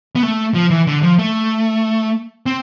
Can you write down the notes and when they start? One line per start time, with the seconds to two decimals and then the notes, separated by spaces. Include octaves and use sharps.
0.16 B3
0.23 A3
0.54 F3
0.70 E3
0.87 D3
1.03 F3
1.19 A3
2.46 C4